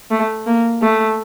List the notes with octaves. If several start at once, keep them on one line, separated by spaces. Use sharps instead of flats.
A3
A#3
A3